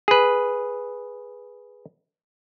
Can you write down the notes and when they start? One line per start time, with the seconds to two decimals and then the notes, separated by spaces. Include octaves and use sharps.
0.08 G#4 B4